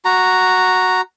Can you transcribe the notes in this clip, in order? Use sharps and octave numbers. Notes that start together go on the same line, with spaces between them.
F#4 A#5